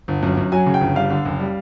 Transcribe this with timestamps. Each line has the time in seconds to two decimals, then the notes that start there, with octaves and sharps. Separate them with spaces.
0.08 G1
0.23 F#2
0.37 F#2
0.52 F#3 G#5
0.66 C#3
0.74 G5
0.81 G1
0.96 G3 F5
1.10 D3
1.25 F#1
1.40 G3